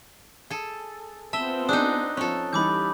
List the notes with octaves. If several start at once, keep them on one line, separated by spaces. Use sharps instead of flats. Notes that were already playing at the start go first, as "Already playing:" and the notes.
G#4 A4
B3 C4 F4 E5 A5 E6 G7
D4 D#4 G#4 D#6 F#6
F3 C4 C#4 A4
E3 G3 D#4 G4 B5 D6 G6